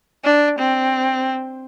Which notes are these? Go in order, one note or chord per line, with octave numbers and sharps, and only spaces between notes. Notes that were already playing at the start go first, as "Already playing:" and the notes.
D4
C4